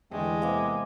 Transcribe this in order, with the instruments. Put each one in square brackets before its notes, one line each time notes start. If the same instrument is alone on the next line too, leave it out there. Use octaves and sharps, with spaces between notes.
[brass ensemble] E2 [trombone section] D3 A3 G4 [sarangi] G#3
[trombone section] C3 A#3 B3 [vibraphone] F5 G#5 D6